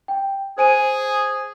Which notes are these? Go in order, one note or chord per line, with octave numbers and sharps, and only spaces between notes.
G5
G#4 C5 G#5 D#7